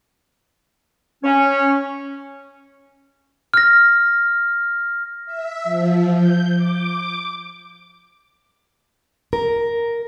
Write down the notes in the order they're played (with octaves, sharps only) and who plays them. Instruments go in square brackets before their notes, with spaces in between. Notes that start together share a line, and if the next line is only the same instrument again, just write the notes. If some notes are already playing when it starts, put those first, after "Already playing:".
[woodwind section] C#4
[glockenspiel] F6 A#6
[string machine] E5
F3
G6
D6
[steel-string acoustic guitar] A#4